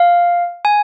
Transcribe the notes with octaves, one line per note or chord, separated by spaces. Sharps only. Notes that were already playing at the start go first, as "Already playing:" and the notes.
Already playing: F5
G#5